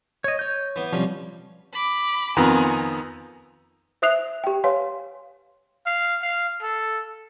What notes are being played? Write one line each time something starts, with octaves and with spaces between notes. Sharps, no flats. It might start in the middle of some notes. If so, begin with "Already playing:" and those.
C#5 D#5
C#5 G6
E3 B3
C3 F3 G3 C#4
B5 D6
F2 D#3 B3 G#5 A#5
C5 E5 D#6 F#6 C7 F7
G4 G5
B4 C#5 F5 G#5 C6
F5
F5
A4